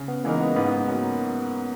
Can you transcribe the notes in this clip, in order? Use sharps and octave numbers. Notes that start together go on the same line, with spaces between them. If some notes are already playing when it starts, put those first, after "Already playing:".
Already playing: C#3 C#4
B3
E3 G#3 A#3 D#4 A#4
B3
G#2 B3
F#3 A#3